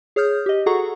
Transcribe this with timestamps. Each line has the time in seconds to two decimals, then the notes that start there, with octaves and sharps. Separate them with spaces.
0.16 G#4 C#5 D#6 F6 G6
0.46 G4 D#5
0.66 F#4 G#4 A4 F#5 A#5 C#6